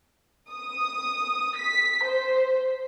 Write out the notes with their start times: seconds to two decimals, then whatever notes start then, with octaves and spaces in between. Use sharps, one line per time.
0.50 D#6
1.56 B6
2.05 C5